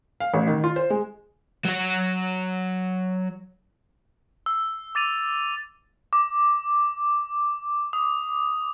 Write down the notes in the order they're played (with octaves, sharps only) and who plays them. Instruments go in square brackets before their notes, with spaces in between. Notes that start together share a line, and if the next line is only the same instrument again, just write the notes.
[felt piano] F5
A1
D#3
F4
C5
G#3
[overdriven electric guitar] F#3 F#4
[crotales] E6
D6 A6 D#7 F7
D6
D#6